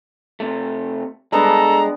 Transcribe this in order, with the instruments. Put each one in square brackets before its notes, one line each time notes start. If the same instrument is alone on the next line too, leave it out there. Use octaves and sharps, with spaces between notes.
[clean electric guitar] C3 A3
[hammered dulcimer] G3 B3 D4 [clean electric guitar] G#3 [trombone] A4 [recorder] A#5